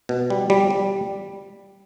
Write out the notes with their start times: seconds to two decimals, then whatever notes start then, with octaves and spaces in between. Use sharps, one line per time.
0.09 B2
0.30 G3
0.50 G3
0.70 G3